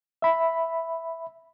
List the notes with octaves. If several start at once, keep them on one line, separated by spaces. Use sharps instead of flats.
E5 B5